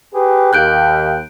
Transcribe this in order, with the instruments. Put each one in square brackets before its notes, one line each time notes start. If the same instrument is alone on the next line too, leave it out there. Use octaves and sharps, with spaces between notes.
[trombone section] G4 G#4 B4
[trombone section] D#2 [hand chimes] F#6 G6 D7